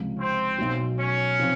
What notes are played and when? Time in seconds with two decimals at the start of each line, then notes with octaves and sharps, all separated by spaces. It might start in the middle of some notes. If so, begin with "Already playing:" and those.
Already playing: C#2 C3 F3
0.18 C4
0.58 B1 B2 F#3
0.98 C#4
1.39 C3 F3